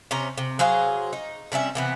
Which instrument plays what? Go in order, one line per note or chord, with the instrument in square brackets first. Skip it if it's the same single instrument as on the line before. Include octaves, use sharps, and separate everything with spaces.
[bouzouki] C3 C#4 C5 A#5
C3
F#3 G#4 C5 F5
D#4
C3 G3 C#4 E5
C3 E3 B3